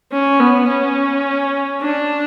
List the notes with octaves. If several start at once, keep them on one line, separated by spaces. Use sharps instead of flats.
C#4
B3
C#4
D4